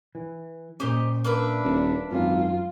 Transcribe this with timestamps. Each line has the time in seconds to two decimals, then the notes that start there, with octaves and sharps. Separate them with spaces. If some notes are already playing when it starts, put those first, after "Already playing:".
0.15 E3
0.80 A#2 C#4 G4 C5 D#5
1.24 A#3 D4 B4 E5
1.63 D#1
2.11 G#1 F#2 F4